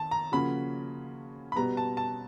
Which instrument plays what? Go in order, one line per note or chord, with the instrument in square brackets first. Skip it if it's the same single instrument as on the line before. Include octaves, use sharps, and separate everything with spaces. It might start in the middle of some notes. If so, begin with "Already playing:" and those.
Already playing: [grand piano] D#3 [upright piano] A5
[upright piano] A#5
[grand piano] C#3 F3 A#3 C#4 F#4 [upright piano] B5
[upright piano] B5
[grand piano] B2 G3 B3 [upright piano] A#5
[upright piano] A5
A5